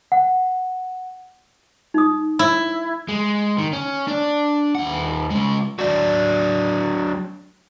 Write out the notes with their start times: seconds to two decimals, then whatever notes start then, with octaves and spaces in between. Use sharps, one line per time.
0.12 F#5
1.94 D#4 D#6
2.39 E4
3.08 G#3
3.58 D#3
3.73 C#4
4.08 D4 D5
4.75 D#2 F#5
5.30 G#3 C#4
5.79 F#3 D4